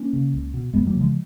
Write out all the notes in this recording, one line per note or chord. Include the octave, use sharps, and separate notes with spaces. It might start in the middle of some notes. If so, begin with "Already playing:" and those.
Already playing: A#3 C#4
C#3
C#2
B2
F2 G#3 B3
F#3 A#3
C#3
F3 G#3